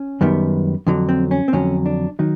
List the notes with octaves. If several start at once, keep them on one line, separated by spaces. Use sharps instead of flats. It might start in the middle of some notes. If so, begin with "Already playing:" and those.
Already playing: C#4
F#2 D#3 G3 B3
F2 D3 F#3
C4
C#4
C4
F2 D3 F#3 C#4
D4
D#3 F#3 D#4